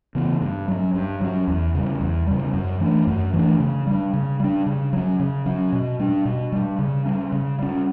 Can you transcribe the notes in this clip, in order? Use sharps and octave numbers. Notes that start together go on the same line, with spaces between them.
C#3 E3 B3
G2
F#3 C#4
G2
F#3 C#4
E2
C#3 G3
E2
C#3 G3
F#2
E3 A3 D4
F#2
E3 A3 D4
C#3
G3 D4
C#3
G3 D4
C#3
F#3 C#4
C#3
F#3 C#4
B2
G3 D4
B2
G3 D4
C#3
G3 C#4
C#3
G3 C#4